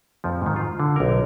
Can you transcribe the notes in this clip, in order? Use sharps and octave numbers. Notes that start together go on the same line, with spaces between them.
F2 F3
G#2 D#3
F4
D3
B1 A#4